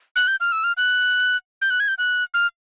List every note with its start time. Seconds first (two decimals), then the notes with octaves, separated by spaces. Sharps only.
0.16 F#6
0.28 G6
0.41 F6
0.52 E6
0.64 F6
0.77 F#6
1.62 G6
1.70 F#6
1.80 G#6
1.88 G6
1.98 F#6
2.34 F6